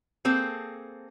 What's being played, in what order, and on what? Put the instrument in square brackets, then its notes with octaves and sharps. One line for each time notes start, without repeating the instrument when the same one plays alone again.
[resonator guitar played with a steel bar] A#3 C4 G#4 A4